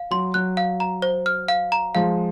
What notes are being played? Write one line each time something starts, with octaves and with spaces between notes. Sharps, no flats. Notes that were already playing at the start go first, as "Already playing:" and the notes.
Already playing: F5
F#3 C6
F#3 F#6
F5
A#5
C5
F6
F5
A#5
F3 G#3 F5